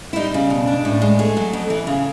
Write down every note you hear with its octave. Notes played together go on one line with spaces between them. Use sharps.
E4
G3 D#4
C#3
B2
D4
A2
G#3
A3 G#4
F#3
F2
E3
C#3